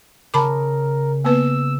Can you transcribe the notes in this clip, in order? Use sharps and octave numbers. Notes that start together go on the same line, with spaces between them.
C#3 A#4 A5 B5 D6
A#3 B3 B4 E6